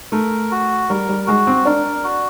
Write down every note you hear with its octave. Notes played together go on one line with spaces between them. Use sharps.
A3 A#4
F#4
G3 A#4
G3
G#3 F#4
C4
D4 A#4
F#4